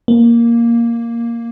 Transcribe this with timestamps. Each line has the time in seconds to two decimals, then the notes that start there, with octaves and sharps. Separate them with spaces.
0.08 A#3